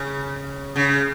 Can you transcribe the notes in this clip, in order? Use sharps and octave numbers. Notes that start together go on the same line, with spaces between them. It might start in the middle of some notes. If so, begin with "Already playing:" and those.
Already playing: C#3
C#3